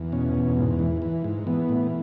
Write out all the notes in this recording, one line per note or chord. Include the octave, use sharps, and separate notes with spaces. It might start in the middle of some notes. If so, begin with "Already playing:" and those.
Already playing: E2
B2 C#4
E2
G#2
E3
E3
G#2
E3 B3
A2